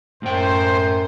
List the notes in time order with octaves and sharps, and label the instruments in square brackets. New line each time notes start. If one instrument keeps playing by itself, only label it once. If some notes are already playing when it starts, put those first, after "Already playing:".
[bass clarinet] F#2 [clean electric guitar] A2 G5 [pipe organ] C5